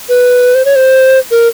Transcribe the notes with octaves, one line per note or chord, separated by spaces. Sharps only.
B4
C5
C#5
C5
A#4